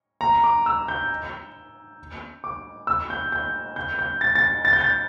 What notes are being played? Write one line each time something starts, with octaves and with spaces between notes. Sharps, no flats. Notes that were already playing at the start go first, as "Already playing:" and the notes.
A#5
D6
E6
G6
D6
E6
G6
G6
G6
G6
A6
A6
A6
G6
A6